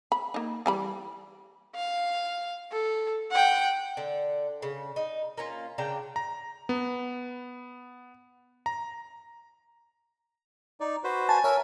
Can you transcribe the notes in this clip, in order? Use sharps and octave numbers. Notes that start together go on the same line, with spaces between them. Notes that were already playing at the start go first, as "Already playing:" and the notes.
B5
A#3 D#4
E3 G3 B5
F5
A4
F#5 G5
D3
C#3
D#4
A#3 C#4 F4
C#3 D4 G5 A#5
A#5
B3
A#5
D#4 D5
F#4 B4 C5
G#5 A5
A#4 C#5 E5 E6